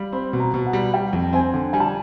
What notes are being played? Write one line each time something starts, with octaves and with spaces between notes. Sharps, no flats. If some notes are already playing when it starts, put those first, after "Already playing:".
Already playing: G3 F5 B5
C4 B5
B2
A#5
B2
F#5
G3
G3 G5
F2
C4 G#5
D3
G3 G#5
A5